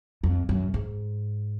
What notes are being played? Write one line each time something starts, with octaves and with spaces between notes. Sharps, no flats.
F2
F#2
G#2